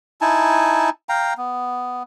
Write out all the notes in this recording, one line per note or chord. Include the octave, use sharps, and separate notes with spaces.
D#4 E4 G#5 A5
F5 G5 A#5
B3